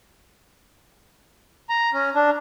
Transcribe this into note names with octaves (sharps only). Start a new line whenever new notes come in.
A#5
C#4
D4